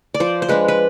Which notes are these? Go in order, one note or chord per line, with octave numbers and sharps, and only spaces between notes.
D5
F3 C5
C5
G#3 D4 B4
B4